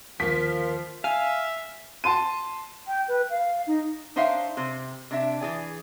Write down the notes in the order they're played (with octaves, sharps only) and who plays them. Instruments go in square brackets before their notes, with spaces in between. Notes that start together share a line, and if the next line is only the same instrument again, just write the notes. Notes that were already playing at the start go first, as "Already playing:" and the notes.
[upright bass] D#2 D3 [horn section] F3 [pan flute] A#4 [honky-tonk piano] B6
[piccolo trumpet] E5 [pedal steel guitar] F5 [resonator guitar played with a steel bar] G#5
[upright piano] A5 C6 D#7
[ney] G5
B4
F5
D#4
[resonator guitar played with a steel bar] D4 D#4 C5 C#5 E5 F5
C3 C5
C3 D4 E5
E3 G#4 D5